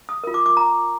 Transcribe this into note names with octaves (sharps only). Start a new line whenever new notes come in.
D#6
F4 A#4
D6
D6
A#5